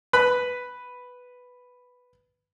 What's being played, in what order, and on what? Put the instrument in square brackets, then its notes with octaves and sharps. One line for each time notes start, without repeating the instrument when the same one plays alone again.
[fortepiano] B4 B5